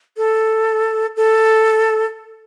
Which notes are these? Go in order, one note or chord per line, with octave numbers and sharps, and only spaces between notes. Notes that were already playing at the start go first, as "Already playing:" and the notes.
A4
A4